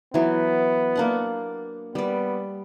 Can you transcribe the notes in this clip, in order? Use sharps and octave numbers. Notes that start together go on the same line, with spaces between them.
E3 F#3 B3
A#3 D4 F#5
G3 B3 D5